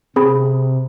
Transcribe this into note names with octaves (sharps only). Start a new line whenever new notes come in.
C3 C4 G#4 B5